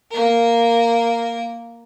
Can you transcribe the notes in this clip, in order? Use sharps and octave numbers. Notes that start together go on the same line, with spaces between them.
A#3 A#4